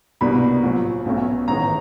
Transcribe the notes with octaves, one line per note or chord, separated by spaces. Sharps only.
C2 B2 G3 A#3 D4 B5
A#1 A2 F#3
B1 B2 F#3 A3 C#4
A1 G#2 D#3 A#5